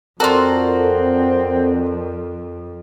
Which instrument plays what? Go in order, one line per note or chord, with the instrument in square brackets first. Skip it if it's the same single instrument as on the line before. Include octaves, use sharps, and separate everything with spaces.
[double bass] F2 [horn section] C4 [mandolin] F4 F#4 [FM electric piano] A4 A#4 D5